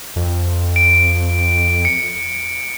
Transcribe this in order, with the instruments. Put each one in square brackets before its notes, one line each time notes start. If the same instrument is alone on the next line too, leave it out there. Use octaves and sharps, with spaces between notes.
[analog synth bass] F2
[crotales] D7
C#7